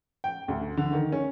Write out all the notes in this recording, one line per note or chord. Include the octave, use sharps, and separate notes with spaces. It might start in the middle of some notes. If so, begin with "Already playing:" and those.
G5
D2
D3
D#3
C#4